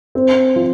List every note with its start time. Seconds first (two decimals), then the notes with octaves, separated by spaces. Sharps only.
0.15 C4
0.56 F3